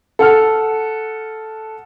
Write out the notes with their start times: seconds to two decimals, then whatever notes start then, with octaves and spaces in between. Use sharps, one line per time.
0.19 A4 F#5 F6